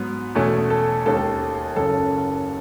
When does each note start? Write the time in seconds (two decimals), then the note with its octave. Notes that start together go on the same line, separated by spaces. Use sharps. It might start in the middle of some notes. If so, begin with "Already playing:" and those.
Already playing: G#2 F#3 B3
0.35 E2 B2 A3 C#4
0.70 A4
1.06 D#2 D#3 G#3 C#4 A4
1.17 A4
1.76 F#1 F#2 C#3 A4